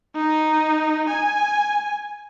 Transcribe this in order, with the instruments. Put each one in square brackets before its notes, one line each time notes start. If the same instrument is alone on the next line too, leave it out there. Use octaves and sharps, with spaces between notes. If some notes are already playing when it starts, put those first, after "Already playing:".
[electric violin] D#4
G#5